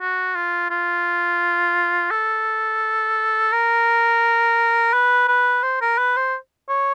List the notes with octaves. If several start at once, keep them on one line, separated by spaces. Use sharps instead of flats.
F#4
F4
F4
A4
A#4
B4
B4
C5
A#4
B4
C5
C#5